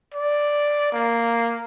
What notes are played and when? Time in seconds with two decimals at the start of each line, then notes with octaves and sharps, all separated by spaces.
0.14 D5
0.92 A#3